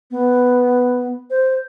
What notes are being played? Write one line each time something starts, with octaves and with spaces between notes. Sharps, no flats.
B3
C5